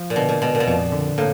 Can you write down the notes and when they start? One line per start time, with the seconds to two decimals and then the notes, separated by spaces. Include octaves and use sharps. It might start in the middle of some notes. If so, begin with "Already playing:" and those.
Already playing: F3
0.10 A#2
0.16 B2 D3
0.29 A#2
0.42 B2 G#3
0.55 A#2
0.60 B2
0.67 F2 A#2
0.92 D3
1.18 A2 A#3